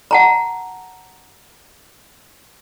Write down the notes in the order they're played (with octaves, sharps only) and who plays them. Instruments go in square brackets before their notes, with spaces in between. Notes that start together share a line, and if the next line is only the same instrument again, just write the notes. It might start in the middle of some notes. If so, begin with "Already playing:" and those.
[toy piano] F#5 A5 A#5